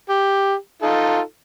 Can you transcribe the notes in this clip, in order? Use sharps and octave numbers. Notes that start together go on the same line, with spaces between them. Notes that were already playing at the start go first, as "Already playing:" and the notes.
G4
D#4 F4 A4